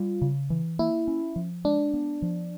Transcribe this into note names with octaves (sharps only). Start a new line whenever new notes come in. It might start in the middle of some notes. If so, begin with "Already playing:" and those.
Already playing: G3 F4
C#3
E3
A#3 E4
C#4
F3
G#3 D4
B3
F3